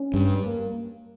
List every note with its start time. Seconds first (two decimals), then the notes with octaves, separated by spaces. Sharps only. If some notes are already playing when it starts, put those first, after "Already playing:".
Already playing: C#4
0.14 G2
0.45 A#3